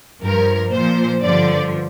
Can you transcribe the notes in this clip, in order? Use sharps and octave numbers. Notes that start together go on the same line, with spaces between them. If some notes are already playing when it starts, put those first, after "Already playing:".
G2 F3 A#4
A#2 F3 C5
G2 D3 F3 D5